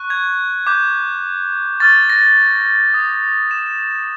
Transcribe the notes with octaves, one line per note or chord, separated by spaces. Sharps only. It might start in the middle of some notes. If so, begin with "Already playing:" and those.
Already playing: C#6 F#6
G#6
D6 G6
C#6 F6 A6
A#6
D#6 G6
E7